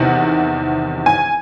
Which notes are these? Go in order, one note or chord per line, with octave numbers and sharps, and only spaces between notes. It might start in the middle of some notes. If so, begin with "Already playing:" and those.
Already playing: E2 C3 D#3 F#5
G#5